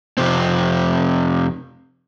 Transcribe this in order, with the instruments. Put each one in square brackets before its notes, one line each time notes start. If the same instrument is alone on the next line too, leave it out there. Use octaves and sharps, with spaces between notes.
[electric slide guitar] F2 C3 C4